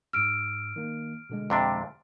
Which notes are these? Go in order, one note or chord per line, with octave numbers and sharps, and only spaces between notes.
G#2 E6 F6 D7
D#3 A#3
B2 D3 G#3
F2 C3 D4